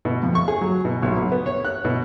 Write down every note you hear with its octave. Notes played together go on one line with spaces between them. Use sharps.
B2
F2
C#6
G#4
F#3
B2
B1
B1
B3
C#5
F#6
B2